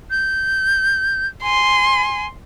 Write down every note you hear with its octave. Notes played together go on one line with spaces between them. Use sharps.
G6
G#5 C6